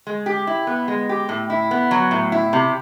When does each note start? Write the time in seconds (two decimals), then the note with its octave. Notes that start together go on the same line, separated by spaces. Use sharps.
0.07 G#3
0.26 G4
0.47 E4
0.67 B3
0.88 G#3
1.09 G4
1.29 A2
1.50 E4
1.71 B3
1.91 F#3
2.11 A2
2.32 E4
2.53 C3